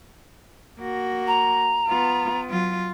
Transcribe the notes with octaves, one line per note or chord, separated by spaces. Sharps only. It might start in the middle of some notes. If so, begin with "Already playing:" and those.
A#3 F#4
A#5
B3 F4
F#3 F4